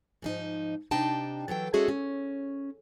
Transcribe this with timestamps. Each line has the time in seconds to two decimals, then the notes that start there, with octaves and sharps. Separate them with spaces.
0.22 G#2 F3 D#4
0.91 C3 D4 D#4 G5 A5
1.48 E3 F#3 A4 G5
1.73 G#3 C#4 F#4 G#4 A4 E5
1.88 C#4